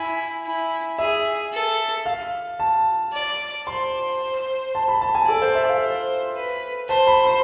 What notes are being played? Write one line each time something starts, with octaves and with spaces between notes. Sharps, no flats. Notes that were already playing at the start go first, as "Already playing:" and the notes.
Already playing: E4 G#5
E4
G#4 E5
A4
F5
A5
D5
C5 C6
A5
B5
A5
G#5
A4 D5
C5
E5
F5
C5
B4
C5 A5
B5
C6